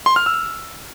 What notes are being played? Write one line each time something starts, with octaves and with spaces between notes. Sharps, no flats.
C6
F6
E6